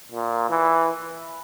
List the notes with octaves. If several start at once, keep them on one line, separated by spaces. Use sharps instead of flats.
A#2
E3